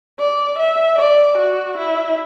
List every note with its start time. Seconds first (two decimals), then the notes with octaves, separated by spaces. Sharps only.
0.19 D5
0.59 E5
0.98 D5
1.38 F#4
1.78 E4